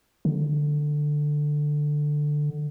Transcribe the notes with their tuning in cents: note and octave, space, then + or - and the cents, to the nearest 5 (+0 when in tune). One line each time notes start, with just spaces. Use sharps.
D3 +10